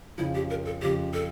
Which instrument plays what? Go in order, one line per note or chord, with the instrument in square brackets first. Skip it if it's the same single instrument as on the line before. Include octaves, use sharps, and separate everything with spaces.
[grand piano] F2 C#3 F3 [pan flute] E4
[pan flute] G4
A#4
A4
[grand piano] F2 C#3 F3 [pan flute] G4
[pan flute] A4